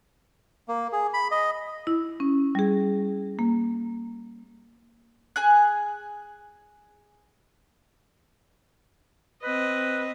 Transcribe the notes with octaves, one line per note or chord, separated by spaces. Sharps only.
A#3
G#4
B5
D#5
E4
C#4
G3 G#4
A#3
G#4 G#5 F#6
C4 B4 D#5